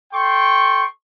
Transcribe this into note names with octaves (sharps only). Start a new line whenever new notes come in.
A4 G5 C6 C#6